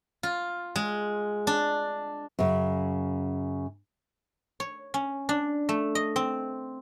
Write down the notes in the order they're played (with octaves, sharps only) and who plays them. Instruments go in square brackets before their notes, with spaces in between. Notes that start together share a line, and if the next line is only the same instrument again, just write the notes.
[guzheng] F4
G#3
D4
[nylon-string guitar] F#2 C#3
[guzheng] C#5
C#4
D4
A3
D#5
C4